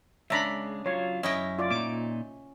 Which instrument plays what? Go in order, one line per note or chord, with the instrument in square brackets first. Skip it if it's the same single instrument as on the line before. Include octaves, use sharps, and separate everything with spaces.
[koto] C#3 D4 [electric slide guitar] G#3 [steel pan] E5 A#5 B5
[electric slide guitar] F#3 F4 [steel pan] C#5
[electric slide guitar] F#2 [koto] C#4 E4 G5 [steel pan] D#5
[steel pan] F4 D5
[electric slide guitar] A#2 D#4 [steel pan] D6